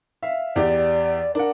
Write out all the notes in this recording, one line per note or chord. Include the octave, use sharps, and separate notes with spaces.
E5 F5
E2 G4 D5
D4 A#4 F#5